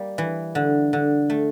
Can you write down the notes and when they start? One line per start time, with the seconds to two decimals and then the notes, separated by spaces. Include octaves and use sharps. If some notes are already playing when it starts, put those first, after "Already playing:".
Already playing: G3 A#3
0.18 E3
0.55 D3
0.93 D3
1.30 A3